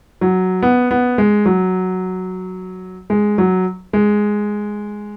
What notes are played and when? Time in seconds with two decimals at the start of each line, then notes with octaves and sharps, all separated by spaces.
0.21 F#3
0.62 B3
0.91 B3
1.18 G#3
1.46 F#3
3.10 G#3
3.38 F#3
3.93 G#3